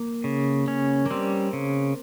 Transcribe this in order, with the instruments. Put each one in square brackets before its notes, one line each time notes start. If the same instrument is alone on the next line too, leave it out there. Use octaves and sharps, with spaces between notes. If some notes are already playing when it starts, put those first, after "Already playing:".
Already playing: [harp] A#3
[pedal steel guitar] C#3
C#4
[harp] A#3
[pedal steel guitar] G3 [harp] C4
[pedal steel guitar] C#3